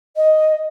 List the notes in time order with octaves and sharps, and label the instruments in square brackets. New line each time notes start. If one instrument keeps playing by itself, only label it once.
[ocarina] D#5